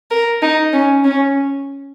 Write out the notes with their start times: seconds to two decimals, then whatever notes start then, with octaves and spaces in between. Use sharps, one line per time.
0.11 A#4
0.42 D#4
0.73 C#4
1.04 C#4